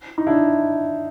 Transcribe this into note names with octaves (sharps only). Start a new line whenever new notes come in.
D#4
D4 E4